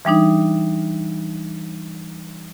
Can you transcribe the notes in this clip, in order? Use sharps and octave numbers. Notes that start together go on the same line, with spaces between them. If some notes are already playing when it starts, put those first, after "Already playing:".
E3 G3 D4 D#4